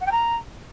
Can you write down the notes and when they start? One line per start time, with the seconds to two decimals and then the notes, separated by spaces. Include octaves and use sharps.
0.01 F#5
0.06 G5
0.11 A#5